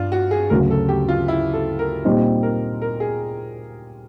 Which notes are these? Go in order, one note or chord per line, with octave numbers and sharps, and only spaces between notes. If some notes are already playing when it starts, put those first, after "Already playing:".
Already playing: G2 D4 F4
F#4
G#4
D2 C#3 F#3 A#4
A4
G4
F4
E4
A4
A#4
A#2 G3 C4 D#4
A#4
A#4
G#4